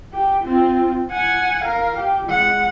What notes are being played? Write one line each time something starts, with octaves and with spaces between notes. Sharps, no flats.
G4
C4 F4
F#5 G#5
A#4 F5
G4
G#3 F#5